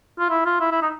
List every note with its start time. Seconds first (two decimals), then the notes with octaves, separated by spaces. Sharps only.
0.19 F4
0.30 E4
0.45 F4
0.60 E4
0.71 E4
0.82 D#4